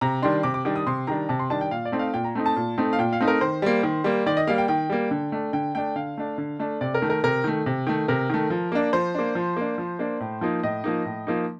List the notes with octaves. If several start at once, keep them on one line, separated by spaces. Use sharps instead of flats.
C3 A#5
D#3 G3 D4 C6
C3 D6
D6
D#3 G3 D4
D#6
C3 C6
D#3 G3 D4 A#5
C3 A5
C6
D#3 G3 D4 A5
G5
A#2 F5
D5
A3 C4 D#4
F5
A#2 G5
A#5
A3 C4 D#4
A5
A#2
A3 C4 D#4
F5
A#2 G5
F5
A3 C4 D#4
A#4
D#3 C5
G3 A#3
D#3
G3 A#3
D#3 D5
D#5
G3 A#3 F5
G5
D#3 G5
G3 A#3
D3
A3 D4
D3 G5
A3 D4 G5
D3 F5
A3 D4
D3
A3 D4
C3 D5
A#4
D#3 A3
A#4
C3 A#4
D#3 A3
C3
D#3 A3
C3 A#4
D#3 A3
F3
A#3 D4
F3 C5
A#3 D4
F3
A#3 D4
F3
A#3 D4
A2
F3 A#3 D#4
A2 D#5
F3 A#3 D#4
A2
F3 A#3 D#4